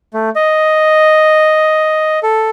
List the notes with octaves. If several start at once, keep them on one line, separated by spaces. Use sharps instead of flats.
A3
D#5
A4